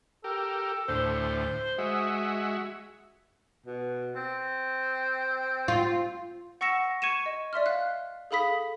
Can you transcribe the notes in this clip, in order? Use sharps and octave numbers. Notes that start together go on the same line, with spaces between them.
G4 A4 A#4
D2 A2 C5
G#3 F#4 D#5 E5
B2
C4
F4
F#5 C#6 E6 A#6 C#7 E7
C#6 G#6 C#7 D#7 E7
D#5
D5 E5 C6 F6
F5 F#6
G#4 A4 F5 B5 D#6 B6